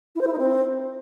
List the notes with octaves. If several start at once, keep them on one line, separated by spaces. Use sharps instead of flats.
E4
C5
E4
D#4
C4